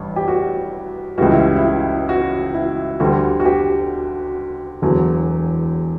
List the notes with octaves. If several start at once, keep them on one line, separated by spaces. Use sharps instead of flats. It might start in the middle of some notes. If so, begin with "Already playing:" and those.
Already playing: A1 G2
G4
F#4
C#2 C#3 E3 G3 F#4
E4
E4
F#4
E4
D2 D3 G3 F#4
F#4
G4
E1 E2 D3 F#3